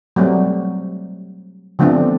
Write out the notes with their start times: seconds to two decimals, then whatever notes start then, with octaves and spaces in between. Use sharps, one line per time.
0.16 F#3 G3 A3 C4
1.79 D3 F3 A3 B3 C4 D4